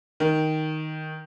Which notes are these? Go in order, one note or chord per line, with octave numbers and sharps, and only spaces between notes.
D#3